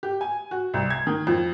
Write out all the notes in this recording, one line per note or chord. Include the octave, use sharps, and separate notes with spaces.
G4
G#5
F#4
C2
G#6
D#3
F2